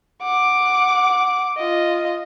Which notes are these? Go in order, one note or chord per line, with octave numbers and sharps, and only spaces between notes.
F#5 D6
F4 D#5